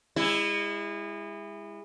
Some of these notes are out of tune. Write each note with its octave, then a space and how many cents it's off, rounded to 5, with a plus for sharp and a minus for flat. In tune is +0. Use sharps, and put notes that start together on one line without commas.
G#3 -35 E4 +0